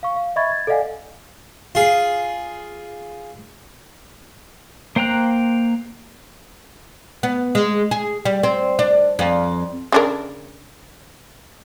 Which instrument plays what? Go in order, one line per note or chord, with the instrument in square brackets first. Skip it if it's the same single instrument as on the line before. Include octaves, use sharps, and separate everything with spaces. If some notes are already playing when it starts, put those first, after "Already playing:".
[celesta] F5 C#6
F5
D#5 E5 B5 C#6 G#6 A6
G#6 A6
A4 D5 D#5 F5 F#5 G#5
[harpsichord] F4 G#4
[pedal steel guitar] A#3 C5 G5 A#5 F#6
[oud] B3
G#3
G#4
G3
C4
D4
F2
[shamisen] C#3 D4 A#4